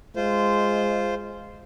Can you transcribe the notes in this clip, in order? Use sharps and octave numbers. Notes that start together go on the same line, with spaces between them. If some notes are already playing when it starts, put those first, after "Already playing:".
G#3 F4 C5